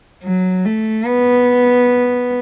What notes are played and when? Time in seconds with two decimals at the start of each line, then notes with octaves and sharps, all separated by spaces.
0.24 F#3
0.65 A3
1.06 B3